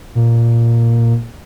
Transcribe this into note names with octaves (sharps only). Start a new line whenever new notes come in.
A#2